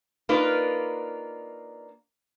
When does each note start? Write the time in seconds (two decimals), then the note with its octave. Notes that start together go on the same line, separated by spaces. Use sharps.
0.29 A#3 D4 D#4 F4 B4